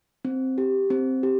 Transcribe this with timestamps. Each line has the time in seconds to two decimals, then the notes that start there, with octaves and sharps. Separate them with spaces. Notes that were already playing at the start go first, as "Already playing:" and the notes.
0.25 C4
0.58 G4
0.90 C4
1.23 G4